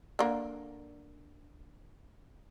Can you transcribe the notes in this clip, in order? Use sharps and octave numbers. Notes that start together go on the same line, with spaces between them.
D3 A#3